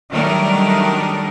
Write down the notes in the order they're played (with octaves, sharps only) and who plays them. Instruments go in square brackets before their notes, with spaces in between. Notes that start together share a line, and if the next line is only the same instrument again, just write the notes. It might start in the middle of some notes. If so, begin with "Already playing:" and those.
[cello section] D#3 F#3 G3 A3 D4 A#4